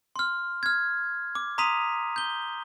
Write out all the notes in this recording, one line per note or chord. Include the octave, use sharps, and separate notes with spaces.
C6 F6
F6 G#6
D6
A#5 C6 D#6 B6 D#7 F7
G6 G7